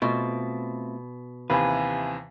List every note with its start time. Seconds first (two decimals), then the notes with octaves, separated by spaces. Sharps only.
0.02 B2 A3 C4 F4
1.50 D#2 C3 E3 B4 F5 G#5